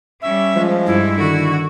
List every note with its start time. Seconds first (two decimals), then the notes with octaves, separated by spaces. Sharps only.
0.22 G3 C#4 E5
0.56 F3 G#3
0.86 G2 E4
1.18 D3 D#3 F#4